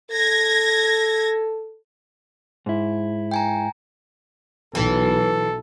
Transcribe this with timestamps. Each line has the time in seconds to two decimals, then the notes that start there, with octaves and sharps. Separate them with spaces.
0.11 A4 G#6 A#6
2.66 G#2 E4
3.31 G5 G#5 A#5
4.75 B1 E3 A4